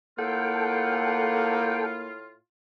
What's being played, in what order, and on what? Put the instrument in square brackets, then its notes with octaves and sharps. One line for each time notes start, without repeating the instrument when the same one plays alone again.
[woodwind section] A2 E4 F4 [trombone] A#3 [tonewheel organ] A4 G5 [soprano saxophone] F#5